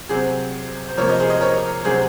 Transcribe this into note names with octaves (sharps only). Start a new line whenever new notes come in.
C3 F#3 C4 G#4 C5
C5
C3 F3 A#3 A#4 C#5
C5 D#5
G#4 C5
C5 D#5
A#4 C#5
C3 F#3 C4 G#4 C5